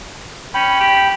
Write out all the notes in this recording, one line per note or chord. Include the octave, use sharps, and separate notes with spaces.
C#4 G5 B5
G4